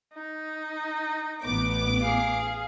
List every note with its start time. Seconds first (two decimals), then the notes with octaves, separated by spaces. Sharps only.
0.14 D#4
1.44 A1 B3 D6
2.02 G#4 F5